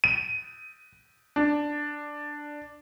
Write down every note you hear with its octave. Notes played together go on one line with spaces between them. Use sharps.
D#7
D4